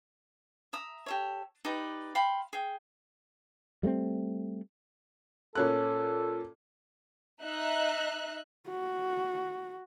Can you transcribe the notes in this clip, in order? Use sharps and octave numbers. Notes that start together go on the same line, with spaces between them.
E5 A#5 D#6
G4 A4 C#5
D#4 G4 B4 D5
F5 G5 B5 C6
G#4 G5
G3 A3 A#3 C4
A#2 C#4 A4 F#6
D#4 E5 F#6
F#4